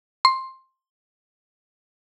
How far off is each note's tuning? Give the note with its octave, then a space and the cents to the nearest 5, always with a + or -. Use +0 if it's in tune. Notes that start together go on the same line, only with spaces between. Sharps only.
C6 +10